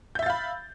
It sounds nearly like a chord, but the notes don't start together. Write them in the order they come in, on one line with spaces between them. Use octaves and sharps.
G6 E5 A6 F5 B5